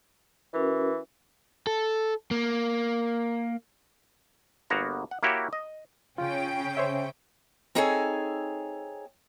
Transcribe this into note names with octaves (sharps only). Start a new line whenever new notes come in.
E3 C#4 F#4 A#4
A4
A#3
G1 A#3 B3 F#4 A#5
F#5
A#3 E4 F#4 G4 C#5
D#5
C#3 C#4 F4 G5
C5 C#5 E5
C4 D#4 G#4 A4 C#5 G#5